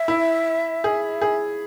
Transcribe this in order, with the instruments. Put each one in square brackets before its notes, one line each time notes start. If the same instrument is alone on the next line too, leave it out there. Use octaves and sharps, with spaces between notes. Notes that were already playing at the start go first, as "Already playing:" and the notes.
Already playing: [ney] E5
[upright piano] E4
G#4
G#4